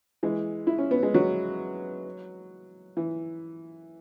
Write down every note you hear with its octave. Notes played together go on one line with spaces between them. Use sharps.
E3 G#3
E4
C#4
B3
G#3
F#3
E3